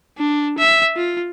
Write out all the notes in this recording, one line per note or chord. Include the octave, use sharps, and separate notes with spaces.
D4
E5
F4